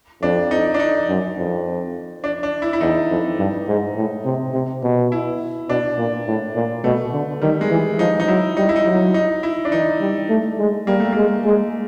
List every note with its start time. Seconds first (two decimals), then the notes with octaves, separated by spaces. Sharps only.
0.22 F2 D4
0.51 D#4
0.74 D4
0.80 D#4
1.08 F#2
1.37 F2
2.24 D4
2.43 D4
2.62 E4
2.73 E4
2.81 E2 D#4
3.10 F2
3.38 G2
3.68 G#2
3.96 A2
4.25 C3
4.54 C3
4.83 B2
5.12 E4
5.69 B2 D4
5.98 A#2
6.27 A2
6.55 A#2
6.84 B2 A3
7.13 D3
7.41 D#3 G3
7.61 G#3
7.70 E3
7.99 F3 D#4
8.20 D#4
8.28 F#3 E4
8.57 G3 D#4
8.69 E4
8.76 D#4
8.86 F#3
9.14 D#4
9.43 E4
9.65 D4
9.72 E3 D#4
10.01 G3
10.29 A3
10.58 G#3
10.87 G3 A#3
11.00 A3
11.13 G#3 A#3
11.45 G#3